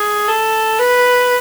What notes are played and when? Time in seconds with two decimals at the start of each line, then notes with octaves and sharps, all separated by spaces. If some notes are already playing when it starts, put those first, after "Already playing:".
Already playing: G#4
0.28 A4
0.79 B4